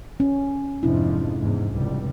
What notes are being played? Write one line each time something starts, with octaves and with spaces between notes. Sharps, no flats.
C#4
F2 G#2 C3 F3 D4 E4
E2 G#2
F1 C#2 G3